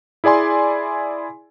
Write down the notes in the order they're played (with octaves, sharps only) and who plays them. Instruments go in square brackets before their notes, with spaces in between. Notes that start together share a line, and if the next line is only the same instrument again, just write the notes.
[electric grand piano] E4 G#4 D5 G#5 C6